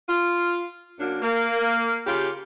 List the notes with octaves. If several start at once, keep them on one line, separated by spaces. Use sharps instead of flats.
F4
F#2 A#3 D4 F#4
A#3
C#3 F4 G4